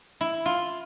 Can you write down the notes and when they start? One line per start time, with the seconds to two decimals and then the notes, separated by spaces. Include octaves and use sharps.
0.21 E4
0.46 F4